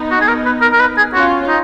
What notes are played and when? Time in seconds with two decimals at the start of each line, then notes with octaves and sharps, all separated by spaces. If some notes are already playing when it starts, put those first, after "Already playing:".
Already playing: B3 D#4
0.11 F#4
0.21 G#4
0.28 A#4
0.46 B4
0.62 A#4
0.72 A#4
0.80 B4
0.97 G#4
1.14 C#4 F4 F#4
1.48 D#4